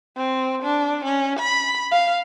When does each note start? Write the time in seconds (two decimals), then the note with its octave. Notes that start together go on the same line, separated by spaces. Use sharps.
0.17 C4
0.63 D4
1.04 C#4
1.39 B5
1.92 F5